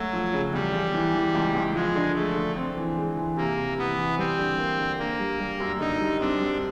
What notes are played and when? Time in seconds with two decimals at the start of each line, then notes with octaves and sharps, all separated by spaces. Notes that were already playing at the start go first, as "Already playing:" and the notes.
Already playing: F#3 A3
0.13 F3
0.33 C#3
0.53 E2 G3
0.74 E2
0.94 E3
1.14 E3
1.35 C#2
1.55 C#2
1.75 F3 G#3
1.95 D3
2.15 G#3 A3
2.35 D3
2.56 C4
2.77 E3
2.97 G#3
3.17 E3
3.37 C3 A#3
3.58 C3
3.78 E3 B3
3.98 E3
4.18 G3 C4
4.39 D3
4.58 A#3
4.79 D3
4.99 D3 A#3
5.20 G3
5.40 G3
5.60 F#2
5.80 D3 D#4
6.00 G3
6.21 C4 D4
6.40 G3